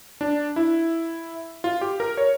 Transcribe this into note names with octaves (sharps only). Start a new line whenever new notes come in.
D4
E4
F4
G4
A#4
C#5